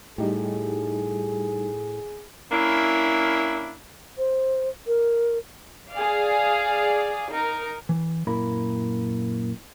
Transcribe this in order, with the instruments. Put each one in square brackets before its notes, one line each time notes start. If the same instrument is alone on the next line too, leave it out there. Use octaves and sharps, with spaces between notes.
[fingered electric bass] A2 [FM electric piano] G3 D#4 G4 [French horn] G#4
[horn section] A#3 C#4 D4 E4
[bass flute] C5
A#4
[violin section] G#4 D5 F5
D#4 A#4
[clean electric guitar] E3
F#2 A#2 E4 A#4 B5